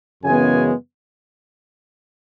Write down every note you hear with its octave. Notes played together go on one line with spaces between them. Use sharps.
F#2 C#3 E3 G#3 B3 G#5